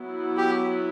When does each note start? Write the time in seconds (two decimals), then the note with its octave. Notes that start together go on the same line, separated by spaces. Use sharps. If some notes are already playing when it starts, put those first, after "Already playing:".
Already playing: F#3 B3 E4
0.38 G4